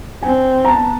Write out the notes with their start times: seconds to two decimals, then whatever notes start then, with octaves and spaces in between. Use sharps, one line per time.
0.23 C4 G#5
0.65 A#5
0.68 B3 A5